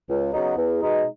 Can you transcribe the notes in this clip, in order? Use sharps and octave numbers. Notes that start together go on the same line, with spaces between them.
C#2
C#3 F#3 B3 D#4
E2
B2 G#3 D#4